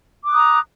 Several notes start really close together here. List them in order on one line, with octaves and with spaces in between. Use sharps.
D6 F#6 D#6 A#5